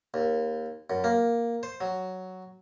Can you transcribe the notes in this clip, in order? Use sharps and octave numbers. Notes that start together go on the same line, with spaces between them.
D#2
F#2
A#3
C5
F#3